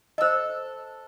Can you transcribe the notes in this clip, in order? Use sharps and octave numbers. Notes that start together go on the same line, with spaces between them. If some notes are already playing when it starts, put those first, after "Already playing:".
A4 C5 D#5 E6